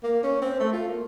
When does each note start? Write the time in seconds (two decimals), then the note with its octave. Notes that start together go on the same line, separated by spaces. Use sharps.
0.03 A#3
0.23 C#4
0.42 C4
0.59 A3
0.73 F4
0.88 A#3